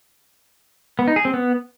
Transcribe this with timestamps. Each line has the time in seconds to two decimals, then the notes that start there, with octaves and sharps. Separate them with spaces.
0.99 B3
1.08 D#4
1.16 G#4
1.25 C4
1.34 B3